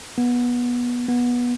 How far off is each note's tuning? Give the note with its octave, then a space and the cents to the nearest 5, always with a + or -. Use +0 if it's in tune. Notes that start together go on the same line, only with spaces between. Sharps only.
B3 -20
B3 -20